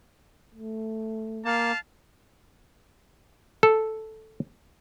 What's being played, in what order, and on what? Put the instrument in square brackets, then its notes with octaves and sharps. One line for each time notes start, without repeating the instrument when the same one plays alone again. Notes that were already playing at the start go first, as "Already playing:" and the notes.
[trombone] A3
[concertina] A#3 [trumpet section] F5 A5
[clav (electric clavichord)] A4